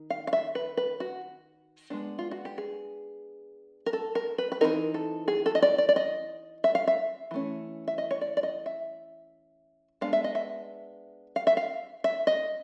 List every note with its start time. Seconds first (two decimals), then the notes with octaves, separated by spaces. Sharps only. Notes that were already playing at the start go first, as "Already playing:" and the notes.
Already playing: D#3
0.10 F5
0.27 F5
0.33 E5
0.55 B4
0.77 B4
1.00 F#4
1.90 G#3 B3 D4
2.19 F4
2.31 F#4
2.45 G4
2.58 G#4
3.86 A#4
3.93 A4
4.15 A#4
4.38 B4
4.52 B4
4.61 E3 A3 C4 D#4 A#4
4.94 A4
5.28 G#4
5.46 A4
5.55 D#5
5.62 D5
5.78 D5
5.89 D5
5.96 D#5
6.64 E5
6.75 F5
6.87 E5
7.31 E3 A3 C#4
7.88 E5
7.98 D#5
8.11 C#5
8.21 D5
8.37 D5
8.43 D#5
8.66 E5
10.01 G#3 B3 D4 F5
10.13 E5
10.24 D#5
10.35 E5
11.36 F5
11.47 E5
11.57 F5
12.04 E5
12.27 D#5